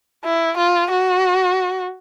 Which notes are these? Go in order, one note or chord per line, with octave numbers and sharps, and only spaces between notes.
E4
F4
F#4